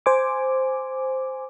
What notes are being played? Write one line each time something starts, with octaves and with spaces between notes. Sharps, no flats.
C5 G#5 D6